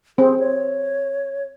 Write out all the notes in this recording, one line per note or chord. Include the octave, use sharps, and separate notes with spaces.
C4 G#4
C#5